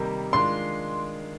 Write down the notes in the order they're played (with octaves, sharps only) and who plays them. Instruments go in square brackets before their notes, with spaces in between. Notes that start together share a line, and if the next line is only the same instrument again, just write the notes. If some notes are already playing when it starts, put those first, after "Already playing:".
Already playing: [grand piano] C3 D#3 G3 A#3 D#4
[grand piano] D#3 G#3 D4 F4 [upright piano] C6